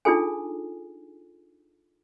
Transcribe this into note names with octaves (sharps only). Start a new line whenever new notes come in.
D4 D#4 F4 G#4 A4 G#5